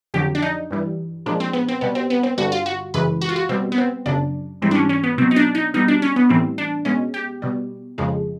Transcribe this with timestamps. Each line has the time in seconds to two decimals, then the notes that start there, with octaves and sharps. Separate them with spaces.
0.14 F2 D3 F#3 G4
0.35 D4
0.42 D#4
0.70 G2 E3 G3
1.26 A#2 F3 G#3 D4
1.40 C4
1.53 B3
1.68 C4
1.81 B2 G3 B3
1.95 C4
2.10 B3
2.23 C4
2.38 G2 D3 G3 F#4
2.52 F4
2.66 F#4
2.94 F#2 C#3 E3 G#3 B4
3.21 F#4
3.29 F4
3.36 F#4
3.49 B2 G3 C4
3.72 B3
3.78 C4
4.06 F#2 C#3 F#3 D4
4.62 G#2 E3 G3 C4
4.71 D4
4.75 C#4
4.89 C#4
5.04 B3
5.18 B2 F#3 C4
5.31 D#4
5.36 D4
5.55 D#4
5.74 B2 G3 D#4
5.88 D4
6.02 C#4
6.16 B3
6.29 A2 E3 G3 C4
6.58 D4
6.85 B2 G#3 C#4
7.14 G4
7.42 B2 G3
7.98 F2 C#3 F3 G#3